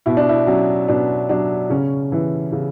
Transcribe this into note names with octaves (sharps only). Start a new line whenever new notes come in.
B2 E4
D4
E4
F#3 C#4
B2 D4
F#3 D4
C#3 C#4
E3
C#3